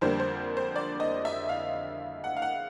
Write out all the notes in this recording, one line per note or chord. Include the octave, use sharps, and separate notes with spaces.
F2 D3 G3 A#3 C5
C5
C5
D5
D#5
E5
F5
F#5
F5
F#5